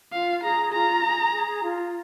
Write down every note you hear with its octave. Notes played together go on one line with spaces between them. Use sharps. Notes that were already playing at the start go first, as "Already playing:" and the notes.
F4 F5
G#4 A#5
F4 A#5
G#4
G#4
F4